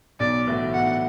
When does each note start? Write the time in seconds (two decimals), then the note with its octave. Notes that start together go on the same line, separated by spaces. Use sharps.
0.20 B1 D5
0.47 A2 E3 A3 F#4
0.74 B1 F#5